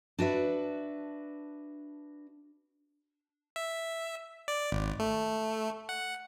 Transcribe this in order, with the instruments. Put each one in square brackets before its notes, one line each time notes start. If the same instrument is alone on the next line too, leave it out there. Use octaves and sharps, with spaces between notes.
[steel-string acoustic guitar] D4 F#4 B4 E5
[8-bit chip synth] E5
D5
G#1
A3
F#5